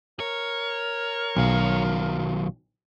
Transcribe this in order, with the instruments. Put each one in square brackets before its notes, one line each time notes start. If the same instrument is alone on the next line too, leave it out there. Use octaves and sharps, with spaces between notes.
[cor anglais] A#4 [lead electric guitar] C#5
[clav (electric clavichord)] B1 [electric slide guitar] D#3 F#3 F5